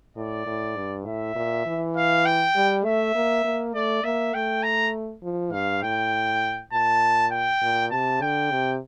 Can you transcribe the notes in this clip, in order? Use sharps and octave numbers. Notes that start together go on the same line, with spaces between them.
A2 D5
A2
G2
A2 E5
A#2
E3
F5
G5
G3
A3 E5
A#3
A#3
A3 D5
A#3 E5
A3 G5
A#5
F3
G2 F5
A2 G5
A#2 A5
G5
A#2
C3 A5
D3 G5
C3